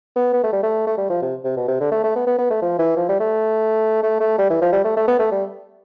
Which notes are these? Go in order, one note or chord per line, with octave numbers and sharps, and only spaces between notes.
B3
B3
A3
G3
A3
A3
G3
F3
C3
C3
B2
C3
D3
A3
A3
B3
B3
B3
A3
F3
E3
F3
G3
A3
A3
A3
G3
E3
F3
G3
A3
A3
B3
A3
G3